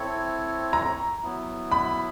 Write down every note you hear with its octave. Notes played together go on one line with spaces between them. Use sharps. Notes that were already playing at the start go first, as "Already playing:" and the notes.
Already playing: C4 E4 A4 C#5
A#5
F#3 B3 E4
B5